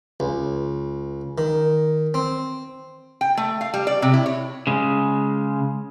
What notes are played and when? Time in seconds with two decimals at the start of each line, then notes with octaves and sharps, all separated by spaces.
0.20 C#2
1.38 D#3
2.14 C4
3.21 G5
3.37 A3
3.61 F5
3.74 G3
3.87 D5
4.02 C3
4.14 E4
4.26 C#5
4.67 C#3 G#3